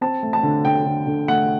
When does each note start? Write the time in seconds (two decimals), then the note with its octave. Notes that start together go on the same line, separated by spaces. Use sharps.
0.01 C4 A5
0.23 A3
0.33 A5
0.43 D3
0.65 D3 G5
0.86 D3
1.07 D3
1.28 A3 F#5